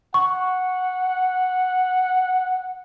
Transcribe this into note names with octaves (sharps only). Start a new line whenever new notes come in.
F#5 C#6